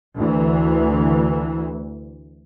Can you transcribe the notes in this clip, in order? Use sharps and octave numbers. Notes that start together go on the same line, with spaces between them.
D2 E3